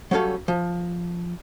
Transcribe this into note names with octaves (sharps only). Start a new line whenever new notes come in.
F#3 G3 C#4 A4 F5
F3